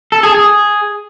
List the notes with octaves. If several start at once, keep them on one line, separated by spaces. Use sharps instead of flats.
A4
G#4
G#4